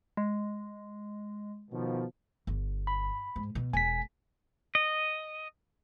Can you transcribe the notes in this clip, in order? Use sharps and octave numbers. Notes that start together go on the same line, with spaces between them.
G#3
B2 D#3 F3
G1
B5
G#2
B2
E1 G#5 B6
D#5